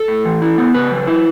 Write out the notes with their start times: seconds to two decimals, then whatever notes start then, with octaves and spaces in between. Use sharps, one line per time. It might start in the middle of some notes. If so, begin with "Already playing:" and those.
Already playing: A4
0.08 A2
0.25 E3
0.42 E4
0.58 B3
0.74 C#3 B4
0.91 F#3
1.07 E4